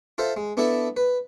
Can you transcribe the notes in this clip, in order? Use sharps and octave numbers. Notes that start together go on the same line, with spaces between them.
F4 A4 C5 E5
G#3
B3 D4 E4 A4 E5 A5
B4